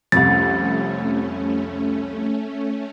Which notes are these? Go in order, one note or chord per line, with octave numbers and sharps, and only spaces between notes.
C2 F2 A3 C#4 A6